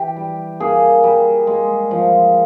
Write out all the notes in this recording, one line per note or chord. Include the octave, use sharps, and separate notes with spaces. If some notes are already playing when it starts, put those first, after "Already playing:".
Already playing: E3 G4
G3
A#3 G#4
G3
G#3
F3